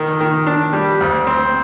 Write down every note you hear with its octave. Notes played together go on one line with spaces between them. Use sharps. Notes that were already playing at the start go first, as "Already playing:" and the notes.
Already playing: D#3
D#3
D4
G3
D2
C4